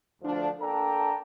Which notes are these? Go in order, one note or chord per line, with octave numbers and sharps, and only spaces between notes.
D2 F3 D4
A#3 D4 A4 G5 A5 A#5